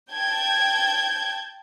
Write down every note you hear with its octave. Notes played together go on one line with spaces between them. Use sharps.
G5 A5 G6 G#6